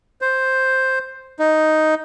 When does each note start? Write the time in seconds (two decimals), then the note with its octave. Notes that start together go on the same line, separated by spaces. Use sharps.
0.21 C5
1.40 D#4